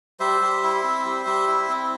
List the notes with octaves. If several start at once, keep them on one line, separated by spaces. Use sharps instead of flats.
G3 C5 E5
G3
E4
C4
G3
G3
E4
C4